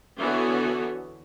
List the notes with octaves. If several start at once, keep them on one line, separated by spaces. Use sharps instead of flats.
D3 E3 B3 F#4 C#5